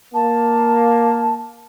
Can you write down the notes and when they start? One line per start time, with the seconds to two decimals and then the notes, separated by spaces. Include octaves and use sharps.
0.14 A#3 A5